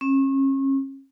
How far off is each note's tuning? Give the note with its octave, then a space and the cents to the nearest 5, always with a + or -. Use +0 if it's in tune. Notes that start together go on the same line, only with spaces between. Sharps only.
C#4 -35